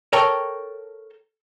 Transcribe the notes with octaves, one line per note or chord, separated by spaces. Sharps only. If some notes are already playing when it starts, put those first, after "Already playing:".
A4 A#4 C#5 G5 A5